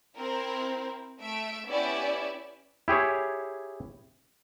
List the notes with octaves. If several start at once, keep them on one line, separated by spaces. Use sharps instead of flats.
C4 E4 A#4
A3 E5 D7
B3 C#4 E4 G4 D5 E5
E4 G4 G#4 C#5